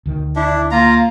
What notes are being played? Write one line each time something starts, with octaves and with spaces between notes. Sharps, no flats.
D2 D#3
D4 E4
A#3 F4 F5 A#5